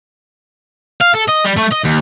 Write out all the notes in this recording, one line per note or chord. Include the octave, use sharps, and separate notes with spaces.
F5
A4
D#5
G3
A3
D#5
D#2